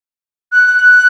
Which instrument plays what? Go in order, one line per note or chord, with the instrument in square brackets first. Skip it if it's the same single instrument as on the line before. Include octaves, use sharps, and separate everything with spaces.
[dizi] F#6